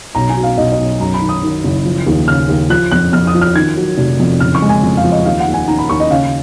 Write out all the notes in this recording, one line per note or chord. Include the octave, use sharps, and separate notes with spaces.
B1 A#5
G#5
B2
F5
B1 D#5
D#5
B1
F#2 A#5
B5
D#3
D#6
D#3
F#1
F3
D#2
C#3 F6
D#2
F3 F#6
F2 F#6
F2 F6
D#6
F3
F6
D#3 G#6
F#3
F1
F2
F#1 F6
C#6
G#3
G#5
F2
F5
F3
D#5
D#2 F5
F#5
D#2
G#5
D#3 A#5
B5
D#2 C#6
D#5
C#3 F5